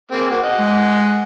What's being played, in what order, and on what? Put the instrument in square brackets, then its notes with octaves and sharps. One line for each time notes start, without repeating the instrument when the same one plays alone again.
[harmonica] A#3 C4 G#4
A#3 F#4
D#5 F#5
[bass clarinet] G#3